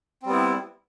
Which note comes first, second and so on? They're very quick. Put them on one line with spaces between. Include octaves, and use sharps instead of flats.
C4 G3 B3 E4